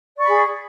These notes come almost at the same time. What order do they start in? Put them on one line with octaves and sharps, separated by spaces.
D5 C#6 B5 G#4